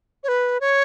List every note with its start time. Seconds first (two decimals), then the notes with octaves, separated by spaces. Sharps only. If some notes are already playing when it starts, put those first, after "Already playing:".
0.24 C#5
0.28 B4
0.61 C#5